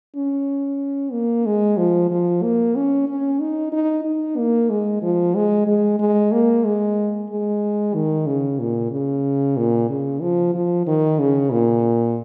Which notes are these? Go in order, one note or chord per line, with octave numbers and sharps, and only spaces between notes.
C#4
A#3
G#3
F3
F3
A#3
C#4
C#4
D#4
D#4
D#4
A#3
G#3
F3
G#3
G#3
G#3
A#3
G#3
G#3
D#3
C#3
A#2
C#3
A#2
C#3
F3
F3
D#3
C#3
A#2